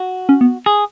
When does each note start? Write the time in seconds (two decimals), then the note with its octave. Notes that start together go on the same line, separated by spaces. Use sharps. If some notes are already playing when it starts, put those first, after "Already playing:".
Already playing: F#4
0.29 C#4
0.41 B3
0.66 G#4